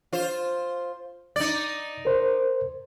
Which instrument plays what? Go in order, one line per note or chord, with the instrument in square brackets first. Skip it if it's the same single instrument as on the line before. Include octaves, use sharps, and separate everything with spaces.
[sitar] F4 C5
[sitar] D#4 D5 [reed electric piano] A6
[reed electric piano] A#4 C5